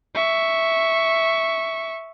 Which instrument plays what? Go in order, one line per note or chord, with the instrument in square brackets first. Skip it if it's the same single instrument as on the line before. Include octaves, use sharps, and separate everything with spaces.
[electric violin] E5 C#6